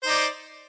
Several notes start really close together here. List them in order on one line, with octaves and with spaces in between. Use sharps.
C5 D#4 D5